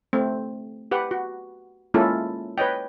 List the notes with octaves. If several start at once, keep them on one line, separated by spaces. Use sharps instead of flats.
A3 C4
G4 B4 F#5
F#4
G#3 A#3 C#4 E4 F4 A4
B4 C#5 D#5 G5